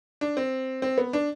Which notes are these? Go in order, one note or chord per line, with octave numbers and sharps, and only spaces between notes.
D4
C4
C4
B3
D4